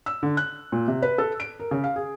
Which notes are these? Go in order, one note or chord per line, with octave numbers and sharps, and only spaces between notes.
E6
D3
F#6
A#2
C3
B4
A4
D7
A#4
C#3
F5
G#4